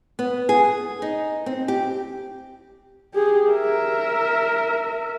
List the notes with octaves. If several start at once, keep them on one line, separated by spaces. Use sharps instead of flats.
B3
G#4
D#4
C4
G4
G4 G#4
A#4 E5